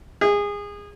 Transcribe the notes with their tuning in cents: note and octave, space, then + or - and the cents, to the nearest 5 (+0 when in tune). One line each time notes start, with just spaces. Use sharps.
G#4 -25